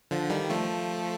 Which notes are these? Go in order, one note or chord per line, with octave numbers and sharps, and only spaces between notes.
D3 F3
D#3 G3
F3 A3